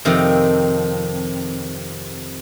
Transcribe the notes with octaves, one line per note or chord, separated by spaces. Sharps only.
F2 C3 D#3